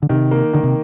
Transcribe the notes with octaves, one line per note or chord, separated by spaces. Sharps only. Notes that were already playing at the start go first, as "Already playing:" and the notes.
D3
C3 D#3
A#3
D3 D#3
C3